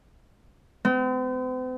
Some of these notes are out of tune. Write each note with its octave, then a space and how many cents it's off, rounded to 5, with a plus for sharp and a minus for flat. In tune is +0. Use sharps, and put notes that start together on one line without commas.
C4 -45